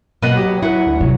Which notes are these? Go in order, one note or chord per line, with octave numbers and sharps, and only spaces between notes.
B2 F#3 A#3 B3 B4 D#5 F#5
G4
E4 B4 F#5
D2
C3 F#3